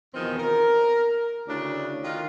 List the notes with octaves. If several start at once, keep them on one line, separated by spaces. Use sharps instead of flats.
E2 B2 D#3 F3 C4
A#4
D2 C#3 D4 E4 D5
D#3 F4